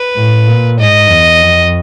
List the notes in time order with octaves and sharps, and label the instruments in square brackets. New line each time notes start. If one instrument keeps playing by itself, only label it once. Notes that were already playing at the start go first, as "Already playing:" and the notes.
Already playing: [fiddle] B4
[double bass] A2
A#2
[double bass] G#2 [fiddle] D#5
[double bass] E2
F2